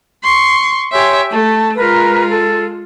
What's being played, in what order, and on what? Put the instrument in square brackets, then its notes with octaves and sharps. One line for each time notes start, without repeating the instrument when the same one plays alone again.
[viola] C6 C#6
[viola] G4 E5 [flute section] C#5 G#5 C6
[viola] A3 [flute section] A5
[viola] G#3 F4 [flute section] A#4 B4 A#5
[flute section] A4